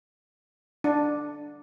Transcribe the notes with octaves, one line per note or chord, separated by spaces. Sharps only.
D4